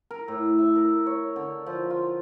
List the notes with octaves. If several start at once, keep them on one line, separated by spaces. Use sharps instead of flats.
A#4
A2
E5
A#4
C#5
D3
F3
F4